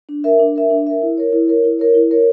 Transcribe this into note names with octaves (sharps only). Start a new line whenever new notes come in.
D4
A#4 E5
D4
A#4 E5
D4
A#4 E5
E4
A#4 C#5
E4
A#4 C#5
E4
A#4 C#5
E4
A#4 C#5